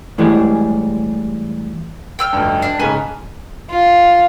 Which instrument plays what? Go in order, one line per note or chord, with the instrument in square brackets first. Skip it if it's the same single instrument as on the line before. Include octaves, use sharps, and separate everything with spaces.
[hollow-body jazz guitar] A2 E3 G3 G#3 G4 G#4
[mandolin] G5 E6 F6
[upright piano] F1 D2 G2
[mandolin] D4 A5
[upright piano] G#2 C#3 [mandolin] B4 G#5 A5
[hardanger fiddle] F4